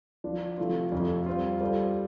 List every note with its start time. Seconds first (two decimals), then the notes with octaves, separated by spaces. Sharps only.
0.24 F3 D4 F4
0.58 C3 F3 A3 F4
0.92 F2 C3 A3 F4
1.26 G3 C4 F4
1.60 G3 F4 A4 C5